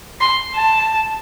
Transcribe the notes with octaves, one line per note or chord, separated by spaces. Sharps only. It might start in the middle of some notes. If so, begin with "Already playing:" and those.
C6
A5